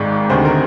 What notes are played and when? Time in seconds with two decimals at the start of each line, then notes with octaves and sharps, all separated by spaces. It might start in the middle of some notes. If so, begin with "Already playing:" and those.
Already playing: G#1 G#2 D#3 D5
0.30 D2 C3 D#3 C5
0.45 A#4